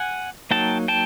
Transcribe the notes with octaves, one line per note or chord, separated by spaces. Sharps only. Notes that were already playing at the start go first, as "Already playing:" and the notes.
Already playing: F#5 G#5
F#3 A#3 D#4 G5 A5
G5 A5